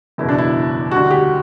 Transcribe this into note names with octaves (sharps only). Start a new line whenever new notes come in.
F#1 E2 B2 E4
D4
E4
D2 D3 G3 F#4
G4